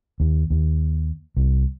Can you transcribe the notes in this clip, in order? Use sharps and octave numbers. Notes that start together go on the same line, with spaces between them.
D#2
D#2
C2